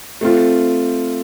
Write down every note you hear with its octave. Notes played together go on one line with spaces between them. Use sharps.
A3 C4 F4